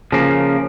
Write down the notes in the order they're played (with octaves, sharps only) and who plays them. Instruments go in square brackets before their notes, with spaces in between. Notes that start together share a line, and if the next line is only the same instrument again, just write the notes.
[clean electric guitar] C#3 F3 A#3